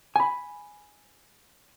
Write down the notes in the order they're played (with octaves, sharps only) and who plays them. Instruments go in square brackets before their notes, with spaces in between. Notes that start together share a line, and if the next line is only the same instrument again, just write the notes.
[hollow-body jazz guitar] G#5 B5